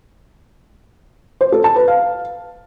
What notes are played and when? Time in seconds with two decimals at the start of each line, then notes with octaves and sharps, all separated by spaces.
1.41 C5
1.52 A4
1.64 A5
1.76 B4
1.88 F5